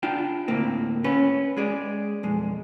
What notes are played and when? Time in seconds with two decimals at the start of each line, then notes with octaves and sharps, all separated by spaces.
0.03 D4 F4 G5
0.48 D2 A2 A#3 C4
1.04 C#4 B4
1.57 G#3 G#4 D5
2.23 B1 F2 G#3